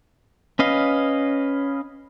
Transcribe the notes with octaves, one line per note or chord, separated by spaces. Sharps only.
C#4 B4 D#5 F5